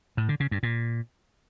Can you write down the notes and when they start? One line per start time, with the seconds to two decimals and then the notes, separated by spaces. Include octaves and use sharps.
0.17 A2
0.29 D3
0.40 C#3
0.51 G2
0.63 A#2